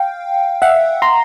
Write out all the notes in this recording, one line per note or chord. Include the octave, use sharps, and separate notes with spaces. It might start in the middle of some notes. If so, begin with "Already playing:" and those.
Already playing: F5 G5
E5 F#5
A#5 C6